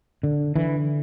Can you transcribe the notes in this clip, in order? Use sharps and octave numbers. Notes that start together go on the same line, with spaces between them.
D3
D3 E3